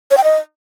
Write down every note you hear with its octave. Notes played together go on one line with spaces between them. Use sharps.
C#5
G5
D#5